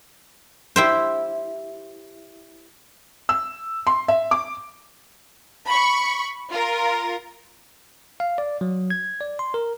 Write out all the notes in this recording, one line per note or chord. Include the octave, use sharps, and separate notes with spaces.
E4 G4 C5
E6
C6
E5
D6
B5 C#6
F4 A#4
F5
D5
F#3
G#6
D5
C6
A#4